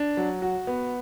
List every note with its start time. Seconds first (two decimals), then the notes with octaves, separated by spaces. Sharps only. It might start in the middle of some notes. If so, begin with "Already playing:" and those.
Already playing: D4
0.17 F#3
0.42 F#4
0.67 B3